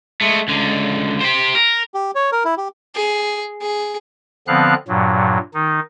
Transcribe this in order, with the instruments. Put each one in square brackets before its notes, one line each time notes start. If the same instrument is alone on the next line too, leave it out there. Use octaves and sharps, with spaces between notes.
[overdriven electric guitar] G#3 A3
C#2 D3
G4 C5
A#4
[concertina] G4
C#5
A#4
E4
G4
[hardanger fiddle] G#4
G#4
[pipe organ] D3 F3 B3 C4 F5 F#6
G2 A#2 F#3
D#3 D#4